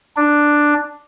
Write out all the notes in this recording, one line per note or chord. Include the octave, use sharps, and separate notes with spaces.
D4